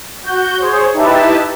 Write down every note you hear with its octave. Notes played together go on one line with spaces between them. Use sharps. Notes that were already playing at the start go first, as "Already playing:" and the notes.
F#4 G6
G#4 C5 C#5
D#4 E4 G4 B4 E5 A5